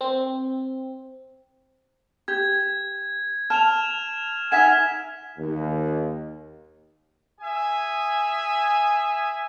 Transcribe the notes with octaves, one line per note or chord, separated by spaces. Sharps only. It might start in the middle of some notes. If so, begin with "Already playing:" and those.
C4
G4 G#6
A5 F6 E7 F7
D#4 E5 F#5 G#5 F6 B6 E7
D#2
G#4 E5 G#5